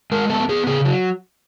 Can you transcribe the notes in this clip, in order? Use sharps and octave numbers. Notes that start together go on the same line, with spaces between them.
G#3 A#4
B3 A4
B3 G#4
C#3 G#4
F#3